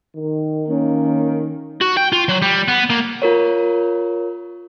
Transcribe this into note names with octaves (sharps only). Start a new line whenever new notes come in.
D#3
D#3 A#3 C#4
F#4
G5
F4
F#3
G3
B3
A#3
F4 A#4 C#5